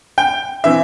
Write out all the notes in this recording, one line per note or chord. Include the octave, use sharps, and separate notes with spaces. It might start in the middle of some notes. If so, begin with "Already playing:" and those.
G5
E3 C4 E5